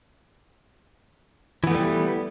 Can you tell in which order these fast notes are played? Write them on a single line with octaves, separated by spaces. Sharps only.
E3 B3 A3 G3